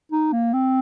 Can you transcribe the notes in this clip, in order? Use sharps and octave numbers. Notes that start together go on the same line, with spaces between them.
D#4
A#3
C4